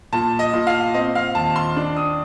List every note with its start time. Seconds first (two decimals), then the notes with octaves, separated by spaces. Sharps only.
0.13 A#2 A5
0.39 D#5
0.53 A#2
0.67 F5
0.94 C4 D#5
1.15 F5
1.35 D#2 A5
1.56 C6
1.76 D4
1.97 D#6